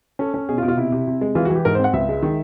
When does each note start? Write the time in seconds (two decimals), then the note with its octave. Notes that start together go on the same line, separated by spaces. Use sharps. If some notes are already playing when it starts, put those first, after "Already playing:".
0.19 C#4 A4
0.34 C#4
0.49 B2 G#4
0.58 F4
0.63 B2
0.68 F4
0.77 C3 E4
0.92 C3
1.07 C3
1.21 G#3
1.35 E3 F4
1.45 F#4
1.50 E3
1.56 G4
1.65 G#2 A#4
1.75 C5
1.79 C4
1.84 F#5
1.93 C#2 E5
2.09 G#3
2.23 D#3